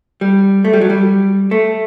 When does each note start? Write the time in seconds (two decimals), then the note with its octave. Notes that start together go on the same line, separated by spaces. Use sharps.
0.21 G3
0.65 A3
0.73 G3
0.81 F#3
0.90 G3
1.51 A3